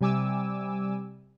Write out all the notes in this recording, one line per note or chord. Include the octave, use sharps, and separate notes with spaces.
C3 G3 G#5 D6 E6